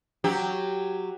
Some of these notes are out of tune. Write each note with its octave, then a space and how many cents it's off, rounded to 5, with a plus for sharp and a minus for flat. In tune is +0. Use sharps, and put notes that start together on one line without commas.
F#3 +0 G4 +0 C#5 +0